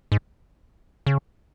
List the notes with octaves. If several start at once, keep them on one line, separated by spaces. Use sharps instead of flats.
G#2
C#3